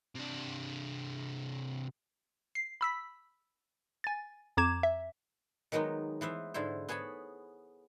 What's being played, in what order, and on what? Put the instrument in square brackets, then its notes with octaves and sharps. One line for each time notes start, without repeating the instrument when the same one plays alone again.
[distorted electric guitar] C3 D4
[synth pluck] C7
B5 E6 B6
G#5 A6
F2 A#5 D6 G#6 E7
E5
[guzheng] D#3 F#3 G#3 B3 D#4
E3 B3 C5 E5
G#2 D3 E4 C5
B3 G#4 C#5 A5 B5